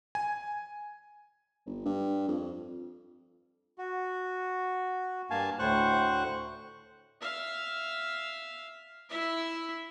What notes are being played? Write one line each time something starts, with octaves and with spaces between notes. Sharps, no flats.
G#5
G1
G2
F2
F#4
G2 A#3 F5 G#5 A5
D2 A2 C5 C#6 F#6
E5 F5
E4 E5